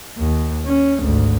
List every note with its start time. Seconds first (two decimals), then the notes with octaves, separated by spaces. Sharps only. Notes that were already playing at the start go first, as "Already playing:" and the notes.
0.19 D#2
0.66 C#4
1.02 G#1 D2